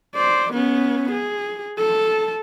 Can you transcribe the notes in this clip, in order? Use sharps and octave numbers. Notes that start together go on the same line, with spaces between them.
C5 D5
B3 C#4
G#4
A4 A5